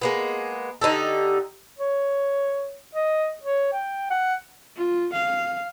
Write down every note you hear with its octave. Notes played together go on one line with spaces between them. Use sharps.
G#3 A#3 B3
D3 D#4 G4 A4
C#5
D#5
C#5
G5
F#5
F4
F5